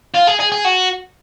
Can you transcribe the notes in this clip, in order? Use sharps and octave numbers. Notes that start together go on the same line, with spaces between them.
F4
G#4
G#4
G#4
F#4